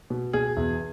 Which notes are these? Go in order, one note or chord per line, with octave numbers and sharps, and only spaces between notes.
B2
B2 G#4
E2